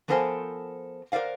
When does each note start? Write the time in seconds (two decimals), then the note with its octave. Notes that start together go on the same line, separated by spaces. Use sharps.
0.08 F3 B3 A4 A#4 C5 G#5
1.12 A#4 C5 D5 F5 F#5